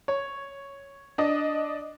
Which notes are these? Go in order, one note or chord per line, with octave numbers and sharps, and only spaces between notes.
C#5
D4 D#5